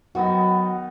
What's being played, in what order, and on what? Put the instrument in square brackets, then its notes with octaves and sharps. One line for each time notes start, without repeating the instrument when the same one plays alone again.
[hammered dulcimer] D#3 B3 D#4 [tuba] F#3 [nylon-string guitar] F#4